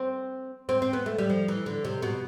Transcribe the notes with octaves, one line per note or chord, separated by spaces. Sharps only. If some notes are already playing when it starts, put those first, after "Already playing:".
Already playing: C4
C4
C4
B3
A3
G3
F3
E3
D3
C3
B2